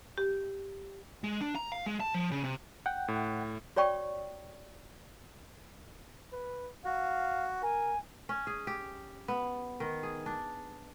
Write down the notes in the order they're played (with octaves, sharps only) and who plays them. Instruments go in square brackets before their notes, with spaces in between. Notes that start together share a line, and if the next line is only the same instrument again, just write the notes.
[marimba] G4
[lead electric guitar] G#3
D4
A#5
F5
G#3
A5
F3
C#3
C3
[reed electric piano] F#5 G5
[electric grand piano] A2
[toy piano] F#4 C#5 D5 G5 C#6
[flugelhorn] B4
[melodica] F#4 [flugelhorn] F5
[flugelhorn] A#4 [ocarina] G#5
[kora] C#4
G#4
G4
B3
D#3
G#4
D4